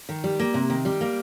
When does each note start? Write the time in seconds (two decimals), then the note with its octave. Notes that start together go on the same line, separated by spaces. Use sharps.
0.09 D#3
0.24 G3
0.40 A#3
0.54 C3
0.70 D#3
0.85 G3
1.01 A#3